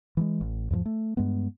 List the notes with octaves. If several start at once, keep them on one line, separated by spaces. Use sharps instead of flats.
E3 F#3 G#3
A1
E2 G#2 E3 F3
A3
G2 G#3 B3